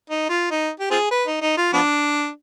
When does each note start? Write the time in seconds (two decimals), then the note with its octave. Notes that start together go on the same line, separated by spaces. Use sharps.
0.10 D#4
0.29 F4
0.51 D#4
0.80 G4
0.91 C4 F4 G#4
1.11 B4
1.27 D#4
1.42 D#4
1.57 F4
1.73 F3 B3 D4